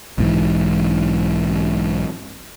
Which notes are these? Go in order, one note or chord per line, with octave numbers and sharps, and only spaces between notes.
B1 G#2 E3